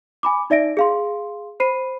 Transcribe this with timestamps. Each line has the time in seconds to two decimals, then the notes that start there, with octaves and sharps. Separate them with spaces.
0.23 G#5 B5 D6
0.50 D#4 D5 E5 A#6 D7
0.77 G#4 F5 C6
1.60 C5 B5 C7 D#7